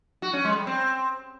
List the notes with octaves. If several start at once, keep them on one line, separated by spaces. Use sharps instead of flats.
F#4
C#4
G#3
G3
C4